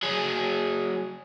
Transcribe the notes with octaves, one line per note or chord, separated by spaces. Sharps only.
F#3 G#4